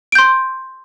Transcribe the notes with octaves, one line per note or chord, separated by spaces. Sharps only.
C6 G6 D7